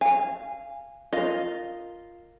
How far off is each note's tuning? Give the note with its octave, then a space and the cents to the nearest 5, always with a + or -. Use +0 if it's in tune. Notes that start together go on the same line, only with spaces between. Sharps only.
F5 -20 G#5 -20
F4 -5 A#4 -10 D#5 +0